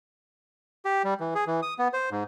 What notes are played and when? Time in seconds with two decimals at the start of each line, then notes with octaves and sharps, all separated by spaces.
0.85 G4
1.04 G3
1.20 E3
1.35 G#4
1.47 E3
1.62 D#6
1.79 B3
1.93 C5
2.11 G#2